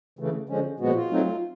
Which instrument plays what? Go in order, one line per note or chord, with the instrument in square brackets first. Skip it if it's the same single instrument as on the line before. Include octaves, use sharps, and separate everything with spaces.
[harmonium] C#3 E3 A3
D3 F3 G#3 C#4
A#2 F3 G#3 B3 F#4
F4
F#3 A3 C4 D#4